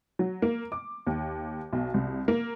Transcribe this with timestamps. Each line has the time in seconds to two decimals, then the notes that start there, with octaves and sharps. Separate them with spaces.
0.19 F#3
0.42 A#3
0.72 D6
1.07 D#2
1.73 B1
1.94 C2
2.28 A#3